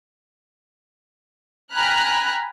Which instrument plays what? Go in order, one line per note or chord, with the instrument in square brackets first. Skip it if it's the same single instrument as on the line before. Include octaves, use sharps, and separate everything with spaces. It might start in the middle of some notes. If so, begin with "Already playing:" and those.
[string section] G5 G#5 A#5 B5 F6 F#6